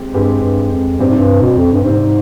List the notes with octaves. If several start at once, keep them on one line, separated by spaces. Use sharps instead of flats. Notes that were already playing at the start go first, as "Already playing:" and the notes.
Already playing: G#3 C4 G4
G2 G#3 C4 G4 B4
G2
F2
G2 C3 G3 C4 G4 C5
G#2
G2
B2
F2
G2
G#2 C3 G3 C4 G4 C5